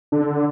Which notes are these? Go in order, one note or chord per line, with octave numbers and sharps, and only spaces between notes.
D3